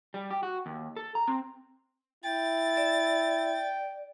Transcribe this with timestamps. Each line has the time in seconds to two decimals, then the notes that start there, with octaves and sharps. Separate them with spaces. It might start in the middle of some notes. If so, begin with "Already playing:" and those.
0.14 G3
0.30 G4
0.43 F#4
0.66 D#2
0.96 A4
1.15 A#5
1.28 C4
2.25 E4 G5 A6
2.77 D5